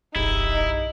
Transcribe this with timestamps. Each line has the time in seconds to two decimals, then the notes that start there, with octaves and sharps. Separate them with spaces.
0.16 E1 A#1 F#2 D#4 E4 G4